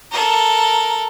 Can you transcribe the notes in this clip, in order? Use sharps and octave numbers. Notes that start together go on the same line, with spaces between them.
A4 A#4